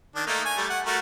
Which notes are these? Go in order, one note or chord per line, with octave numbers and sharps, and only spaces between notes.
D#3 D4
A3 A#3 D#4
G#5
G3 A3
F#5
A3 F#4 A#4